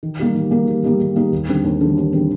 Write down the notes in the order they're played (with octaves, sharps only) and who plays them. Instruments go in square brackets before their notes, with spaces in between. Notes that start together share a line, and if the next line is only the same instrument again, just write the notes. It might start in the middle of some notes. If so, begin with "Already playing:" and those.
[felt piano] D#3
G3 A#3 D#4 G4
D#3
G3 A#3 D#4 G4
D#3
G3 A#3 D#4 G4
D#3
G3 A#3 D#4 G4
D#2
D3 G3 C4
D#2
D3 G3 C4
D#2
D3 G3 C4